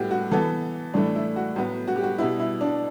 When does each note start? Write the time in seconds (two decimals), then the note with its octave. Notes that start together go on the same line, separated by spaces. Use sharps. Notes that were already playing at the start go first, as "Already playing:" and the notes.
Already playing: A2 G3 B3 E4 F#4 G4
0.11 F#4
0.32 E3 B3 A4
0.94 A2 E3 A3 D4
1.16 E4
1.36 F#4
1.56 A2 F#3 B3
1.87 F#4
1.96 G4
2.03 F#4
2.18 B2 G3 B3 E4
2.40 E4
2.61 D4